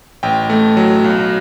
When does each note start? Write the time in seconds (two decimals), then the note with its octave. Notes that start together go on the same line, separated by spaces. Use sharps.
0.23 A1 G5
0.50 A3
0.77 F#3
1.04 B1